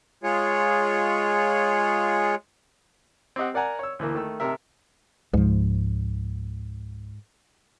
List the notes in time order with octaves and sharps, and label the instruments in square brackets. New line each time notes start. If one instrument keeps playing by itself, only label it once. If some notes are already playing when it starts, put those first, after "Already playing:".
[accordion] G#3 F4 G#4 C#5
[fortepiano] C4 G4 D#5 F#5
A#4 D5 F#5 G#5 A#5
C#5 E6
D2 E3 A#3
D#3 A3 E6
G#1 C3 A#4 E5
[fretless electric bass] C#2 F3 [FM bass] G#2